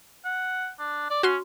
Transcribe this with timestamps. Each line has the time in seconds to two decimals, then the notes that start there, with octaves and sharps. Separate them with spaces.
0.25 F#5
0.79 D4
1.10 D5
1.23 C#4 F#4 C6